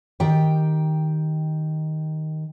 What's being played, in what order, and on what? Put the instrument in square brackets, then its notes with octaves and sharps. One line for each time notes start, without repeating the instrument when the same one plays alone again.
[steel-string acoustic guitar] D#3 G4 G5